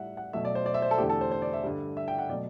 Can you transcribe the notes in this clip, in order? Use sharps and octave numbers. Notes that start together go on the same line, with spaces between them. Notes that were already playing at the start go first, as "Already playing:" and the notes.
Already playing: A2 G3 E5 F#5
F#5
B2 F#3 A3 E5
D5
C5
D5
E5
C5
A4
E2 D3 A3 G4
A4
C5
C5
D5
E5
G2 D3 G3
E5
G5
F#5
B2 F#3 A3 D5